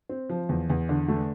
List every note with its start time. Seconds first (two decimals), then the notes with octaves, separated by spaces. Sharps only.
0.09 C4
0.29 F3
0.49 E2
0.70 E2
0.89 D3
1.08 A3